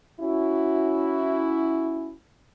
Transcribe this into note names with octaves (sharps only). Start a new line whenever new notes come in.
C#4 E4 F#4